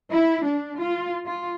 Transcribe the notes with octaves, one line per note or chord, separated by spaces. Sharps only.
E4
D4
F4
F4